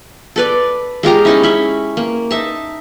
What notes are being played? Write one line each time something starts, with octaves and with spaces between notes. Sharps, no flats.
A4 B4 D5
G#3 F4 G4 A#5
C#4 D#4 E4
C#4 E5 B5
A#3
D#4 E5 A5